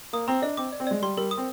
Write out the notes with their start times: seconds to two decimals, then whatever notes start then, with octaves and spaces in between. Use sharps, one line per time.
0.13 A#3 D#6
0.28 C4 A#5
0.42 D4 D#5
0.57 C4 D6
0.72 D5
0.80 C4
0.87 G#3 D5
1.02 G3 C6
1.17 G3 A#4
1.31 D#6
1.37 C4